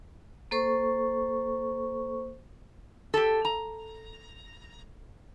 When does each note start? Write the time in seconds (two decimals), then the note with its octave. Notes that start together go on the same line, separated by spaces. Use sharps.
0.51 A#3 A4 C5 C#6
3.14 G4 A4
3.45 A#5